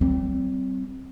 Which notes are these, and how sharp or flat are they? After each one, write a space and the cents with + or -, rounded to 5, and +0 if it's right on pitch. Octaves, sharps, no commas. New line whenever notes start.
G3 -40 C4 +0